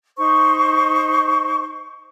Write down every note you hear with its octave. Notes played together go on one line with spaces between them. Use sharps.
D#4 C5 C#6